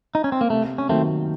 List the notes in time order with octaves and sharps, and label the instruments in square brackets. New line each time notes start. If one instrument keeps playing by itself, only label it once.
[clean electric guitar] D#4
C#4
C4
A#3
[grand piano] C3 [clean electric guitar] A3
[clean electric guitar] C#4
[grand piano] D#3 F#3 A#3 [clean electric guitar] A3 C4